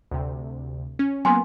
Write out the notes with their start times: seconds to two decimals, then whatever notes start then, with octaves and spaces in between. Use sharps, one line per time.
0.11 D2 C3
0.99 C#4
1.25 F#3 A#3 B3 G#5 C6